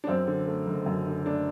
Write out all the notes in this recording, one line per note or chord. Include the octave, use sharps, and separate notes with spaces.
D4
F#2 C4
D3
A3
F#1
F#2
D3
A3 D4